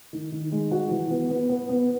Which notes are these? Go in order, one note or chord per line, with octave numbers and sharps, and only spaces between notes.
D#3
D#3
G#3
F#4
E3
B3
B3
B3
B3